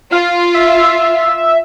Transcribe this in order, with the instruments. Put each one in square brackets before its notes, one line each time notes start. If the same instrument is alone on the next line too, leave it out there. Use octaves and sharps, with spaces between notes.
[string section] F4 [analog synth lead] F5
[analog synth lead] E5